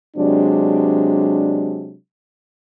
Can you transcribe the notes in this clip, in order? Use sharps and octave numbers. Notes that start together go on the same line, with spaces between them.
C3 F#3 G#3 D4